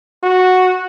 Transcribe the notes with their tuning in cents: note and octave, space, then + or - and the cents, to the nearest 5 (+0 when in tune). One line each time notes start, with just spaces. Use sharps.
F#4 -5